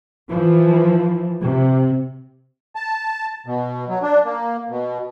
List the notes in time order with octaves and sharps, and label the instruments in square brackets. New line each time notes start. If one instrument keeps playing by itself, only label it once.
[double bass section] E3 F3
C3
[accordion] A5
B2
F#3
D4
A#3
B2